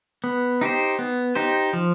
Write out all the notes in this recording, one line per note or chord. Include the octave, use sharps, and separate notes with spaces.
B3
D#4 G4 C5
B3
D#4 G4 C5
F3